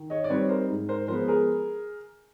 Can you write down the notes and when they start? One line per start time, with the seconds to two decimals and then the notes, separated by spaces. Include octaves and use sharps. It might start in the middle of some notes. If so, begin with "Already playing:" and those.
Already playing: D#3
0.10 C#5 D#5
0.24 D5
0.30 G3 C4 D#4 B4 C#5
0.49 A#4 C5
0.69 G#2
0.88 A#4 C5
1.08 F3 G#3 B3 A#4 C5
1.28 G#4 A#4